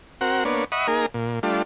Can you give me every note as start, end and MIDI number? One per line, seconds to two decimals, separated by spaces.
0.21 0.44 60
0.21 0.44 66
0.21 0.44 70
0.21 0.44 78
0.45 0.64 58
0.45 0.64 59
0.45 0.64 62
0.45 0.64 73
0.72 0.87 75
0.72 0.87 76
0.72 0.87 78
0.72 0.87 83
0.72 0.87 85
0.72 0.87 87
0.87 1.06 58
0.87 1.06 63
0.87 1.06 68
0.87 1.06 70
1.14 1.40 46
1.43 1.62 55
1.43 1.62 57
1.43 1.62 62
1.43 1.62 65